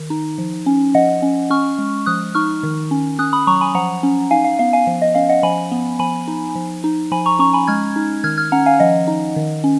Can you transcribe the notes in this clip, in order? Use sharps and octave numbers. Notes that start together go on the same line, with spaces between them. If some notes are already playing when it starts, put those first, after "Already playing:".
Already playing: D#3
D#4
F3
C#4
F3 D#5 F#5
C#4
C#4 C#6 F6
G#3
F3 D#6 F#6
D#4 C#6 F6
D#3
C#4
C#4 D#6 F#6
B5 D#6
F#3 A#5 C#6
G#5 B5
F3 F#5 A#5
C#4
D#4 F5 G#5
F5
B3 F5
F5 G#5
F3
D#5
C#4 F5
D#5 F#5
F3 G#5 B5
B3
F3 G#5 B5
D#4
F3
D#4
F3 G#5 B5
A#5 C#6
C#4 A#5 C#6
G#5 B5
G#3 F6 G#6
D#4
D#3 F6 G#6
F6 G#6
C#4 F#5 A#5
F5 G#5
F3 D#5 F#5
D#4
D#3
C#4